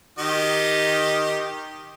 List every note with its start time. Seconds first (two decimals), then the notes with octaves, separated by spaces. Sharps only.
0.19 D#3 G4 D#5